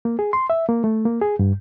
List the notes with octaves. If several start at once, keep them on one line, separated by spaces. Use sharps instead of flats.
A#3
G#4
C6
E5
A#3
A3
A#3
G#4
G2